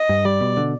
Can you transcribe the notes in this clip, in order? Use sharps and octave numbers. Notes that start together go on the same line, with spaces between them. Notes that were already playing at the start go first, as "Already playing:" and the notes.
Already playing: D#5
G2
G3 D5
B2
D3